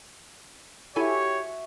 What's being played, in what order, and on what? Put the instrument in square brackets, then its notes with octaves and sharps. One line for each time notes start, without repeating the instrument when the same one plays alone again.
[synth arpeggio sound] E4 A4 G#5 [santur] F#4 E5 [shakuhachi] G4 [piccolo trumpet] C#5